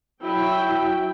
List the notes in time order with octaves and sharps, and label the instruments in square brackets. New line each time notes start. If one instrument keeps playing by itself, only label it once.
[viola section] F#3 E4 G5